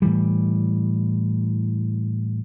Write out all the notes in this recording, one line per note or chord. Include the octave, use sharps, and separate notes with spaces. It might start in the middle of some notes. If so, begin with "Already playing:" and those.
A2 E3 G3